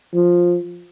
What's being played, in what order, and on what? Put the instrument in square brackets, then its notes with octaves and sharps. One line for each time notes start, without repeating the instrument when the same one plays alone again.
[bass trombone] F3